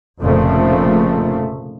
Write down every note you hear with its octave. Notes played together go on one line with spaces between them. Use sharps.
F1 F2 A#2 C#3 F3 A3